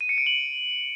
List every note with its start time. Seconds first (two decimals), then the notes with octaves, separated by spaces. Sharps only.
0.01 D#7
0.09 C#7
0.18 D7
0.26 F#7